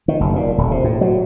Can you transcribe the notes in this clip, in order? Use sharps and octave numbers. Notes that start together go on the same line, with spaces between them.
D#3
F#1
A#2
D#1
C3
A2
F#3